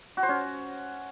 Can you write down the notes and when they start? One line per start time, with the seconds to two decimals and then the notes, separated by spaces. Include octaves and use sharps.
0.17 F#4
0.23 C5
0.29 C#4